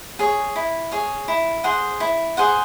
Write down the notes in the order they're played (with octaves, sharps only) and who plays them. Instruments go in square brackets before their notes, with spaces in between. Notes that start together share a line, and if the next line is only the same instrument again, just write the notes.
[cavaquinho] G#4 C#5
E4
G#4 C#5
E4
G#4 C5 F#5
E4
G#4 C5 F#5